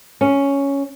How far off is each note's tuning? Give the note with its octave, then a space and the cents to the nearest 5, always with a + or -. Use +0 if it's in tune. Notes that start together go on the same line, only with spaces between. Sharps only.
C#4 +5